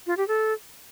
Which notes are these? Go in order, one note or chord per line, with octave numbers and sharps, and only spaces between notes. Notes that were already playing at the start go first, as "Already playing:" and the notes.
F4
G4
A4